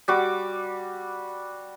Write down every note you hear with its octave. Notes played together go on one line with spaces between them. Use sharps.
G3 F#4 D6